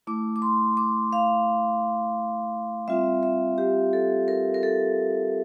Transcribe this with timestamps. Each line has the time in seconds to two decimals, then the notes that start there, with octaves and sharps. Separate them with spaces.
0.07 A3 E4 D6
0.36 D6
0.42 C6
0.77 D6
1.13 F5
2.88 G3 C4 F4 E5
3.23 E5
3.58 G4
3.93 A4
4.28 A#4
4.54 A#4
4.63 A4